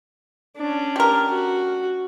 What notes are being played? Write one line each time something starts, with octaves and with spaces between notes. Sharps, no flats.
C#4 D4
G4 A#4
F#4